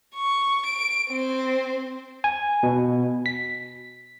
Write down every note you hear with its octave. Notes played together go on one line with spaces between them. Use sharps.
C#6
D7
C4
G#5
B2
B6